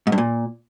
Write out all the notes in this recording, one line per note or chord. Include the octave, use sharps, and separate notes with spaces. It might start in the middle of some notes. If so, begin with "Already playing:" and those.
G#2
G2
A#2